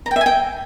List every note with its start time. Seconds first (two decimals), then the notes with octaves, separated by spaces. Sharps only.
0.06 A#5
0.11 G5
0.16 E5
0.21 G#5
0.26 G5